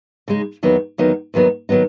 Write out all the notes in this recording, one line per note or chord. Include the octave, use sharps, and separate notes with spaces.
C#3 G#3 D#4
E2 D#3 F#3 B3 D#4
E2 D#3 F#3 B3 D#4
E2 D#3 F#3 B3 D#4
D#3 F#3 B3 D#4